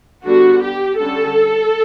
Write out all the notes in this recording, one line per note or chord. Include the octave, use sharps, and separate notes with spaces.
D3 G3 B3 D4 F#4
G4
D3 G3 C#4 A4